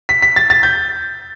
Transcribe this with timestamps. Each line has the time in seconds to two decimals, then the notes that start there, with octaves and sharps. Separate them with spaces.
0.09 B6
0.22 B6
0.36 A6
0.50 A6
0.63 G6